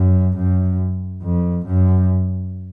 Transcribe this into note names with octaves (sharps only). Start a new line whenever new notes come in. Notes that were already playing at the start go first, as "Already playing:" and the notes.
Already playing: F#2
F#2
F2
F#2